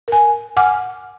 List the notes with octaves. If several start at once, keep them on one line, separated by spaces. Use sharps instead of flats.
A#4 G#5
F#5 G#5 D6 F6